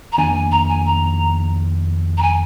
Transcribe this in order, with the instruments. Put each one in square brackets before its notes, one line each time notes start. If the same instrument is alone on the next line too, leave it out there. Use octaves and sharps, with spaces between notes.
[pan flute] A#5
[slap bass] F2 D#3 A#3 D4 [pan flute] G#5
[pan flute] G#5
A#5
G#5
A#5
A#5
G#5